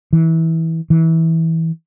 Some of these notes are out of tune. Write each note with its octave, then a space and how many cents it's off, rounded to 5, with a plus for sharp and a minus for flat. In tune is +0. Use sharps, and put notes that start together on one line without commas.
E3 -20
E3 -20